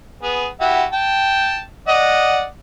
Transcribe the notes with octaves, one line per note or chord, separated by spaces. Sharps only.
B3 G#4
E4 F#4 G4
G5 A5
D5 D#5 F#5